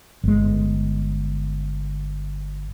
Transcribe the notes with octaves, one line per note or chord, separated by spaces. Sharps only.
G1 G#3